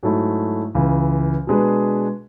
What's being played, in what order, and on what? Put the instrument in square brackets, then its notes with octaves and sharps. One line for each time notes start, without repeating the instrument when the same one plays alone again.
[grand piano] G#2 F#3 A3 E4
C#2 C#3 E3
B2 G#3 D4 G#4 B4